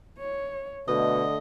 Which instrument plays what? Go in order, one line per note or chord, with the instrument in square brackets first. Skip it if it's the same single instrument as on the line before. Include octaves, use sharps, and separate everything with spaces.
[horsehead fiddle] C#5
[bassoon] B2 [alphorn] D3 [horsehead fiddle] A3 [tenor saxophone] D#5